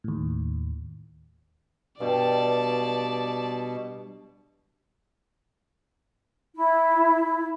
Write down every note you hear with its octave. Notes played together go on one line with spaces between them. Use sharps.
D#2 A2
G2 B2 D5 A5
E4